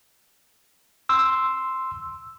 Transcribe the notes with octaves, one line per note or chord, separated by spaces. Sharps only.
C6 E6